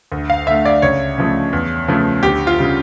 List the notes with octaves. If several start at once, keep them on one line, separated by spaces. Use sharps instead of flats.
D2
F5
D3 A3 E5
D5
C#2 C#5
C#3 F3 A3
E2
C#3 F3 A3
D2 G4
F4
C#3 G3